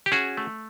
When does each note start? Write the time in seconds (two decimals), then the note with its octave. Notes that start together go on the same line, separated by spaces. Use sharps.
0.06 G4
0.12 C#4 F#4 G#4
0.37 A3